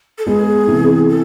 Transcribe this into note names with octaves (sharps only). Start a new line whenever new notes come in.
A4
G#3 B3 G#4
C3 E3
A4